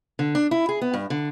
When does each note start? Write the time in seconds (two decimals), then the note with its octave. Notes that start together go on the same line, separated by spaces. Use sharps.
0.19 D3
0.35 D4
0.51 E4
0.69 G#4
0.81 B3
0.94 G2
1.10 D3